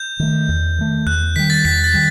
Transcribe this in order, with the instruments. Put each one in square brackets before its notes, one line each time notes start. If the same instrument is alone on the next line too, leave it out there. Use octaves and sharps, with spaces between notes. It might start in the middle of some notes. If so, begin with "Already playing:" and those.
Already playing: [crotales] G6
[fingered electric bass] D#3 A3
E2
D#3 A3
[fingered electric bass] E2 [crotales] F#6
[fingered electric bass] D#3 G3 [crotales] B6
[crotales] A6
[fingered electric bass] E2 [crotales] B6
[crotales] A6
[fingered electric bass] D#3 G3